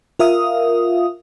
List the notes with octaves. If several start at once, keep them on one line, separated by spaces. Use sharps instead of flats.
F4 A#4 E5 F5 D#6